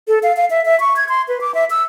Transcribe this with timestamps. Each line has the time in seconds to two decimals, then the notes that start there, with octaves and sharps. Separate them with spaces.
0.08 A4
0.23 F5
0.37 F5
0.50 E5
0.65 E5
0.80 C#6
0.96 G#6
1.09 C6
1.28 B4
1.41 D6
1.54 E5
1.70 E6